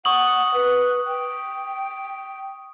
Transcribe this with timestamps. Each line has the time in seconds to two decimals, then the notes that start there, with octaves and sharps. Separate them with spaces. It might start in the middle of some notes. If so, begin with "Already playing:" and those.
0.05 F#5 C#6 D#6 F#7
0.54 B4
1.07 G5